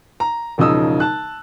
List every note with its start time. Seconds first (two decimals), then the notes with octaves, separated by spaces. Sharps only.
0.20 A#5
0.58 E1 C#3 F3 D#4 D#6 E6
1.00 A5 F#6